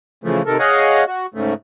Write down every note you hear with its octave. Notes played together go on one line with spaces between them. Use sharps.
C#3 E3 F3 A3
C3 D#3 A4 A#4
G#4 C#5 D#5 F5 F#5
F#4
G#2 C#3 A3